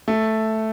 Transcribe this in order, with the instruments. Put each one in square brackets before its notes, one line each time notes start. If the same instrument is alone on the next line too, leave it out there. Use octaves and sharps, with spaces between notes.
[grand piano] A3